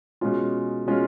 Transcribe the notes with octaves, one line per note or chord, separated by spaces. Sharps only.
B2 G#3 C#4 F4
B2 G#3 C#4 F4